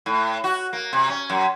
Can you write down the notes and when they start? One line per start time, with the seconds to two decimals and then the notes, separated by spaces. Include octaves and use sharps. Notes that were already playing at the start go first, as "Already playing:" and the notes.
0.06 A2
0.44 F#4
0.73 A#3
0.93 C3
1.09 C#4
1.30 F#2